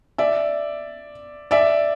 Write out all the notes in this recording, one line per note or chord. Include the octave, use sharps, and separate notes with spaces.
D5 E5
D5 E5